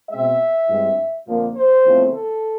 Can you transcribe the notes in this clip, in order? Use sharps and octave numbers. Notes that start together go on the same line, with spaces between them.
B2 G#3 C4 E5
G2 E3 G#3 C4
F2 D3 F3 A#3
C5
E2 C#3 F3 A3 C4
A4